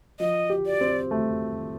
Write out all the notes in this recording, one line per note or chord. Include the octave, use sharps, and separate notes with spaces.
F3 D#5
G4
D5
C4
A3